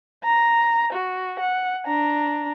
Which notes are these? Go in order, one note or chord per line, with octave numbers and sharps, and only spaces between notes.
A#5
F#4
F#5
D4 A#5